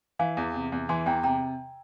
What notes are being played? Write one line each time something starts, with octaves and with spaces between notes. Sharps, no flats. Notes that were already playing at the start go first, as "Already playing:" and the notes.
E3 F5 G#5
E2
C3
E2
E3 G#5 C6
E2 G5 A#5
C3 G5 A#5